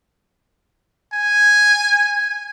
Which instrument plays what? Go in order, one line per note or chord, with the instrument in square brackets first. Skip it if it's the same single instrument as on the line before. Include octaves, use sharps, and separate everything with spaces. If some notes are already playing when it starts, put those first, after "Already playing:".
[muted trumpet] G#5